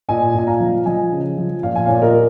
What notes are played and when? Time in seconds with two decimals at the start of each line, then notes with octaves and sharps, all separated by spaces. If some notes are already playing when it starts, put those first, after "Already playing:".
0.09 A#2 D#5 G#5
0.35 A#2 G#5
0.47 F5 A#5
0.60 F3
0.86 F3 D#5 G#5
1.12 C#3
1.38 F3
1.63 A#2 F5
1.76 G#5
1.86 A#2 C#5 F5
2.02 A#4 D#5